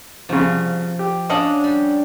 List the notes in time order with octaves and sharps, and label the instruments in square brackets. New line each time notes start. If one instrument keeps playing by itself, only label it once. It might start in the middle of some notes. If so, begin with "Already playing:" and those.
[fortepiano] C2 C#3 [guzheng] F3
[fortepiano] G4
[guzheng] C#4 D4 F#5 [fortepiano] D#5 F5 A5
[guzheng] G3